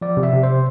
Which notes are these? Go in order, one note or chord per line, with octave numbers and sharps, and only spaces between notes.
F3 D5
C3
E5
C3
C5